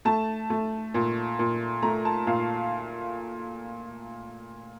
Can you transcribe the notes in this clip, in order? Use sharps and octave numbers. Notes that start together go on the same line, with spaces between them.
A3 A5
A3
A#2
A#2
A3 A#5
A5
A#2 F5